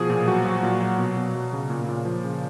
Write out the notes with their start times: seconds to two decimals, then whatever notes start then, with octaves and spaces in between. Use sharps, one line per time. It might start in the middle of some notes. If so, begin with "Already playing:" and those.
Already playing: B2 F3 G#4
0.10 A#2
0.27 F#3 F#4
0.45 F#3
0.63 A#2
0.81 F#3
0.98 B2
1.17 B2
1.35 F#3
1.53 C#3
1.70 A#2
1.89 A#2
2.05 F3
2.24 C#3